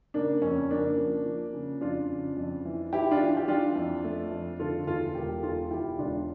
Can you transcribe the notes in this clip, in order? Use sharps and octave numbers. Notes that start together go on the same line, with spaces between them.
C#3 A#3 D4
F2 C#4
C#3 A#3 D4
F3
F3
C#3
F2 D4 F4
C#3
F2
E3
E3 E4 G4
D4 F4
E3
G4
E3 D4 F4
F2
A3
F2
D3 F4 A4
E2 F4 A4
E1 G4 A#4
E2 F4 A4
E2 E4 G4
E1 D4 F4